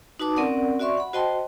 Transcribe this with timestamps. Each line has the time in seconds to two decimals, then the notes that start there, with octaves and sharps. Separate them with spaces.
0.20 D#4 F#4 B4 A5 D6 D#6
0.37 C4 C#4 A#4 D5 F#5
0.79 F#4 D5 E5 C6 C#6
0.97 F#5 B5
1.13 F#4 C5 D#5 G5 A5 C6